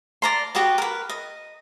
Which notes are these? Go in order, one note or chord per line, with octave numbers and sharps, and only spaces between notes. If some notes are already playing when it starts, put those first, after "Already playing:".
D5 A#5 C6
F#4 G4 B4 D#5
A#4 B4
D#5